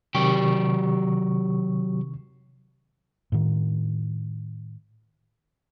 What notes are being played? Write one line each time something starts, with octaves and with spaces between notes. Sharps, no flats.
C3 D#3 F#3 G4 C#6
A2 D#3